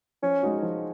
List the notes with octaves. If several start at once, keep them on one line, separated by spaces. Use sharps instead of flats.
F3 C#4
G#3 D#4 F#4
F3